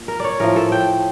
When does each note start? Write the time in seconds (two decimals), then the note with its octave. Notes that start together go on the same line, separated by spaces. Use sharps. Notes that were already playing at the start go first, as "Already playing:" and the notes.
Already playing: A#2
0.08 A#4
0.20 C#5 D5
0.40 A2 F3 A#4
0.56 A4
0.72 G5